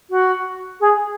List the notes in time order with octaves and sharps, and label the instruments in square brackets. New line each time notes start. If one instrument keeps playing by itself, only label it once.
[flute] F#4
G#4